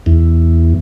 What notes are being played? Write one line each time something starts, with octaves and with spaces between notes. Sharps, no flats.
E2